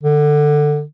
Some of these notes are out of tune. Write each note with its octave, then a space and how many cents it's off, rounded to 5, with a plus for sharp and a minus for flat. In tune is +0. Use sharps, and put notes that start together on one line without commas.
D3 +15